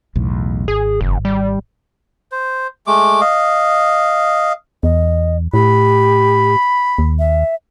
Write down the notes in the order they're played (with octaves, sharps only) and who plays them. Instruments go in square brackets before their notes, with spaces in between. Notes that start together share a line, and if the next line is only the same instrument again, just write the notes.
[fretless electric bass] B1 E2 A2
[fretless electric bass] G#1 [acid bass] G#4
[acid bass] F#1
G3
[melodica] C5
G#3 A3 D6
D#5 F5
[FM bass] E2 [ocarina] D#5
[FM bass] A2 [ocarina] G4 [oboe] B5
[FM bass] D#2
[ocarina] E5